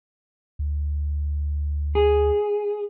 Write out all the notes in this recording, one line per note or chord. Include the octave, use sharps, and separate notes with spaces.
D2
G#4